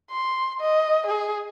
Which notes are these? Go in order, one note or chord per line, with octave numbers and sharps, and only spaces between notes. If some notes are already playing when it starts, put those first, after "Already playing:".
C6
D#5
G#4